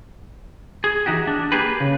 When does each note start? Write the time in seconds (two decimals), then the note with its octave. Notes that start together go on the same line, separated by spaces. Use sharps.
0.84 G#4
1.06 E3 D#4 F#4 G4
1.27 D4
1.52 A#3 G4 G#4 B4
1.80 C#3